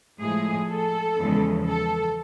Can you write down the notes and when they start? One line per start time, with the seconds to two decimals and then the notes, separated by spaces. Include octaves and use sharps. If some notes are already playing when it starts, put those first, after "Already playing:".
0.19 A2 F3 G#3 G#4
0.68 A4
1.17 E2 C#3 F3 G#3
1.67 A4